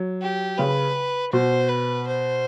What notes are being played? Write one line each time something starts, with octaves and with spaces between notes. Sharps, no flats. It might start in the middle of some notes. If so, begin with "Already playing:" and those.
Already playing: F#3
G4
C#3 B4
B2 C5
B4
C5